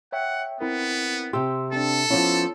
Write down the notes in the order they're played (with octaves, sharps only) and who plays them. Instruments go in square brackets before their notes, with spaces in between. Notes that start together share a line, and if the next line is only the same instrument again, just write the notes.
[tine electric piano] C#5 E5 G5 [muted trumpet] F#5
[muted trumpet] B3 [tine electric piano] C4 E4 A#4
[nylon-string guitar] C3 G4 [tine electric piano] C6 E6
[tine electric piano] C4 D4 [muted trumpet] A4
[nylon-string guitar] F3 B3 C#4 [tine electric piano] E4